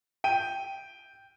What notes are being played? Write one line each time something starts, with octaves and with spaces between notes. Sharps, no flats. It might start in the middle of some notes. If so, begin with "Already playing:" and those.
G5 D#7